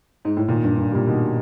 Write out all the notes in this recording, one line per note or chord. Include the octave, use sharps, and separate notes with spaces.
G#2
A2
A#2 D#3
G2
G2
A#2 G3
B2 D#3